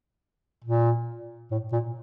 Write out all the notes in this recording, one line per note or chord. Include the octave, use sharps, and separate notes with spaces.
A#2
A2
A#2